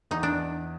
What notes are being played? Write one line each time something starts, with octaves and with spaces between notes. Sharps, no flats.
E2 D#4
D4